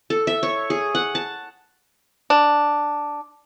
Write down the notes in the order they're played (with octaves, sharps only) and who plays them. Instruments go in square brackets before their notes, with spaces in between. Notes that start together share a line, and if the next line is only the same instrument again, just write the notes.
[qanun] A4
E5
C#5
G#4
F#5
A5
[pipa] D4